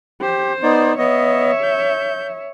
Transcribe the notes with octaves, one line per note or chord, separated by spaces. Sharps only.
G4 C5
B3 D#4 D5
B3 C#5 D#5 E5
G6